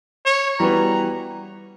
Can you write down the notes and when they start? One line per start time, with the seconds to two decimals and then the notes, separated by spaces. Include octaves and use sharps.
0.26 C#5
0.59 E3 G3 B3 F#4 B4 A#5